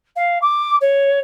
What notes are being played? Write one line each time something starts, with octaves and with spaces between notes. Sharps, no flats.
F5
D6
C#5